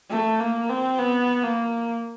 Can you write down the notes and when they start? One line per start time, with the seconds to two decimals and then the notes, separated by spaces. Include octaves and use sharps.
0.10 A3
0.40 A#3
0.69 C4
0.99 B3
1.43 A#3